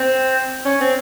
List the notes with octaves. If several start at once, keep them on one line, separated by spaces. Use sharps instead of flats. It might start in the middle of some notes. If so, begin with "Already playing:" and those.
Already playing: C4
C#4
C4